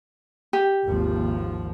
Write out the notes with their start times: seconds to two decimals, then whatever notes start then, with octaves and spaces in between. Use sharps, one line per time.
0.53 G4
0.87 G#1 D#2 F3